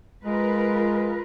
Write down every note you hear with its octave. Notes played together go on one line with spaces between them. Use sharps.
G#3 F4 A#4 B4